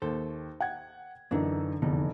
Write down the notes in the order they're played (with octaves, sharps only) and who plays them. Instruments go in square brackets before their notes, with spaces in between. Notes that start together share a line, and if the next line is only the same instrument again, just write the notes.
[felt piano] D#2 [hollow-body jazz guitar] A4 C5
[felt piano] F#5 G5 G#6
[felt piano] F#2 E3 D#4 [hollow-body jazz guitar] D3 D4
[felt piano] F1 E2 [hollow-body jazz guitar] D3 B3 D#4